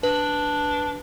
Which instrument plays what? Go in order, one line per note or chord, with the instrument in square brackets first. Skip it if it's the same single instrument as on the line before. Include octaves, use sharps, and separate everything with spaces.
[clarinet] D4 [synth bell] B4